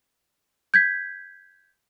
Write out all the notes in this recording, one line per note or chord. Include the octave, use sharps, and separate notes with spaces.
G6 G#6 B6